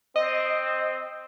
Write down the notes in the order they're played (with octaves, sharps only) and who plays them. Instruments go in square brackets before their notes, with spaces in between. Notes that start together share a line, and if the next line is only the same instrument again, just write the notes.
[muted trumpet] C4 [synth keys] D#5